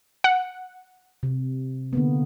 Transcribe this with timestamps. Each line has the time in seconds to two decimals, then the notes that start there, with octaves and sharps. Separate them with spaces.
0.24 F#5
1.23 C3
1.93 D3 A#3 B3